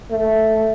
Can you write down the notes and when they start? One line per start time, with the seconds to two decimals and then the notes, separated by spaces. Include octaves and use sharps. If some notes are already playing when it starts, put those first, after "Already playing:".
0.11 A3